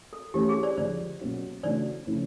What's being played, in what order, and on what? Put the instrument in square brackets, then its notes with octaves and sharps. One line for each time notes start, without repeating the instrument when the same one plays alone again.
[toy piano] A4
[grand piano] E3 A3 C#4 [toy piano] G4
[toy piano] G#4
C5 D5
[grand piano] D3 F3 G#3 [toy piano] C5 D5
[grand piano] B2 F#3 A#3 C#4 F#4
[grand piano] C#3 E3 A3 D4 F#4 [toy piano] C5 D5
[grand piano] C#3 F3 A3 C#4 E4